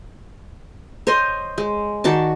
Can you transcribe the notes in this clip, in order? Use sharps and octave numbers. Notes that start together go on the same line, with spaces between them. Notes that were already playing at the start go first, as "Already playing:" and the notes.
C5 C#5 D#5 C6
G#3
D#3 F#4 D5 A5